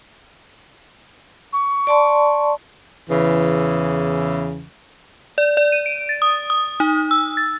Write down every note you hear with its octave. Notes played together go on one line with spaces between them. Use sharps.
C#6
D5 A5 C6
E2 C#3 E3
D5
D5
D#7
D7
A6
D#6
D#6
D#4
E6
A6